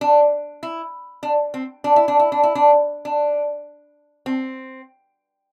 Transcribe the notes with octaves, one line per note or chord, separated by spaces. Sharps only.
D4
E4
D4
C4
D4
E4
D4
E4
D4
E4
D4
D4
C4